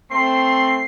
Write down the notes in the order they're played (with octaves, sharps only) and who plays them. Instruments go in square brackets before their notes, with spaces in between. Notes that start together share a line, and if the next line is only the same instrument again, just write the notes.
[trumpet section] A3 C4 C6 [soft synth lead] C7